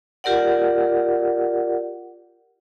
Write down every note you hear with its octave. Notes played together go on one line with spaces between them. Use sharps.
F4 G4 A#4 D5 F#5